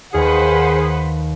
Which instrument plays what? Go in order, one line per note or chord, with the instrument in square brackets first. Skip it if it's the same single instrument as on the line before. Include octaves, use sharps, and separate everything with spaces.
[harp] D#2 [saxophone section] D#3 G#4 [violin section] B4 C5 F#5